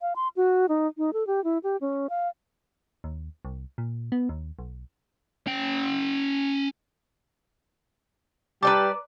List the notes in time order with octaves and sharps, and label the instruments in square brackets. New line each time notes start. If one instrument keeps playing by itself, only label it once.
[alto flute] F5
C6
F#4
D#4
D#4
A4
G4
E4
G4
C#4
F5
[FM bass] D#2
C2
A#2
B3
D#2
B1
[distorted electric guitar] C#4 G5
[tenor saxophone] G3 [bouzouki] B4 D5 A5 [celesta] A#5 D6